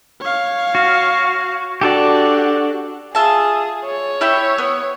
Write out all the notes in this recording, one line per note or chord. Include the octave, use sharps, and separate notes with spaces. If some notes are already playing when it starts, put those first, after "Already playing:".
C#5 F5
F#4
D4 F#4 G4 A4 D5
F4 G#4 E5 A5
C#5
E4 G4 E5
B3